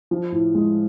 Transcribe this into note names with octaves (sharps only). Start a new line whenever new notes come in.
F3
A2
G#3